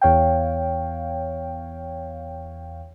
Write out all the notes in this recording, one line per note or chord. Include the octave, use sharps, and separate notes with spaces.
E2 C#5 F5 G5